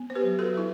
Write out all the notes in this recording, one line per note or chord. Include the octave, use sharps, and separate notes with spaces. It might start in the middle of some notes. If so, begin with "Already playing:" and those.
Already playing: B3
C5
G4 B4
F#3
F#4 A4
F#3 E4